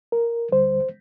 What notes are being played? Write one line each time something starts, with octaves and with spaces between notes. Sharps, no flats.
A#4
D2 D3 G3 C5